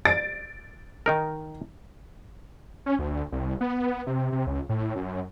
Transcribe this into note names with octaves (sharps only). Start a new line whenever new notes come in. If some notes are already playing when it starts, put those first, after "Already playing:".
A6 D7
D#3 D#4 A#4
C#4
D2
C2
B3
C3
C3
C#2
A2
F#2